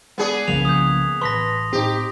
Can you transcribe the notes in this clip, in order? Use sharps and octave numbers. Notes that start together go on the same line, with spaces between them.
G#3 B3 G#4 D5
C2 C#3 F3 A#3 E4 F7
D#6 G6
A1 B4 A5 C6 A#6 B6
A2 C4 D#4 G4